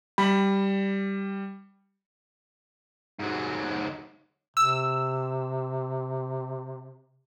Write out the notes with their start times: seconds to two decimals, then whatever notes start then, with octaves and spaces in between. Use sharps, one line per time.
0.18 G3 B5
3.19 G#2 F#3
4.57 C3 E6